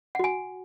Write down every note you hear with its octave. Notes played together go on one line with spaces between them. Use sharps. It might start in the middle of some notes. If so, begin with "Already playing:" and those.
F#4 F#5 G#5